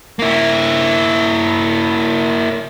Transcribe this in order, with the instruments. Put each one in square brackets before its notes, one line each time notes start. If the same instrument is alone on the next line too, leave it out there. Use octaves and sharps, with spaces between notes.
[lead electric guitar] A#3 E4